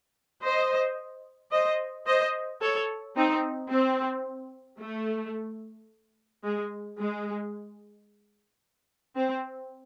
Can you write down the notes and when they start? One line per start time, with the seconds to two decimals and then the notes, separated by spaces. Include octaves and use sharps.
0.43 C5 D#5
1.52 C5 D#5
2.06 C5 D#5
2.61 A4 C#5
3.16 C4 D#4
3.70 C4
4.79 A3
6.43 G#3
6.98 G#3
9.16 C4